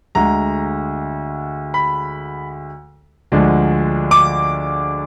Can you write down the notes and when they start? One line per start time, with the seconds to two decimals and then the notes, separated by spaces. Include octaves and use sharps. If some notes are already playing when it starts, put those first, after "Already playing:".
0.15 D2 D3 G#3 A#5
1.74 B5
3.32 D2 D3 F3 G#3 D4
4.11 D6